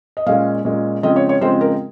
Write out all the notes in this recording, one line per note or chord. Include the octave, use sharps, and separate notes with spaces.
D#5
A#2 G#3 C#4 F5
A#2 G#3 C#4
C#3 F3 G#3 C4 D#5
C#5
C#5
C#3 F3 G#3 C4 C5
A#4